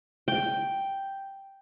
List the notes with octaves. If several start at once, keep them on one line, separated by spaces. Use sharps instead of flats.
G5